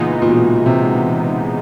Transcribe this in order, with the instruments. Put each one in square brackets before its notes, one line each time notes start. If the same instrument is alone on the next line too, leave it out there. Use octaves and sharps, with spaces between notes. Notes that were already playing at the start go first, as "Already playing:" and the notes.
Already playing: [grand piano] A#2 [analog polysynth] C#3 E3 G#3 B3 D#4
[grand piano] A#2
B2
C3